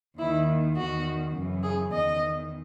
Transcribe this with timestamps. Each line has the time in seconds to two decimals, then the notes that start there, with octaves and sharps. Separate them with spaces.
0.18 D#2 D#3 E4
0.76 E2 D#3 F#4
1.34 F#2 C#3 E3
1.63 G#4
1.92 E2 D#3 D#5